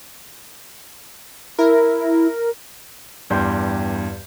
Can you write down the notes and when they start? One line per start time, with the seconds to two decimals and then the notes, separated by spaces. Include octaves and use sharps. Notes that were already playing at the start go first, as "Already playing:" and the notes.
1.59 E4 A#4
3.30 E2 G2 G3 G5 C6 G6